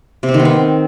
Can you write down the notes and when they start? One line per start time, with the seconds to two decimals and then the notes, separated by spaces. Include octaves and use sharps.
0.23 C3
0.29 C4
0.34 D#3
0.40 B3
0.45 C4